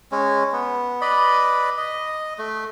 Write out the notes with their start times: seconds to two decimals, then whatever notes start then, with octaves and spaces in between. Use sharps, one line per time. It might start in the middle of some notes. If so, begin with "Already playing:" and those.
0.12 G#3 C#4
0.53 B3
1.01 B4 D5 D#5 B5
1.78 D#5
2.38 A3